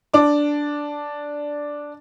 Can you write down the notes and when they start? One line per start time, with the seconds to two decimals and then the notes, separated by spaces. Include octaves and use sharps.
0.14 D4 D6